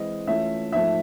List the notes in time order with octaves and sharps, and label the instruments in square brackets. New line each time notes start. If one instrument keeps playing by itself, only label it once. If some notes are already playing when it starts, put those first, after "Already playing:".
Already playing: [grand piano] E3 G#3 C4 E4 D#5
E3 A3 C#4 F4 E5
G#2 F3 A3 E5